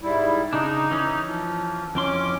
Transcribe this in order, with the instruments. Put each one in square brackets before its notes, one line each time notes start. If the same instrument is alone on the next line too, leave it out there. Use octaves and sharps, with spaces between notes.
[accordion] G#2 G3 E4
[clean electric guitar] C#3 D4 [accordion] D#4
[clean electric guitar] E3 C#4
[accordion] F3
[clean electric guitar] F2 E3 C6 [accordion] C#4 D6